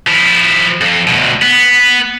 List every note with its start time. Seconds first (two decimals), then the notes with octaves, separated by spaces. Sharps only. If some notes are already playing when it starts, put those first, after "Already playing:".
0.07 F3 E4
0.81 F2
1.07 D2 B2
1.42 B3